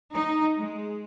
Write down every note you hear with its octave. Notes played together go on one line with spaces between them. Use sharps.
D#4
G#3